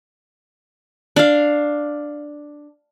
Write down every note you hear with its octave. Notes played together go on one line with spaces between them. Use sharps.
D4 F5